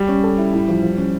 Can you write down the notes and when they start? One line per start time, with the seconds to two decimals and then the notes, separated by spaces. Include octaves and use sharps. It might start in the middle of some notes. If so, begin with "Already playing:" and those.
Already playing: G3
0.08 C#4
0.23 A4
0.38 E4
0.53 A2
0.68 F3
0.83 F3
0.98 C#4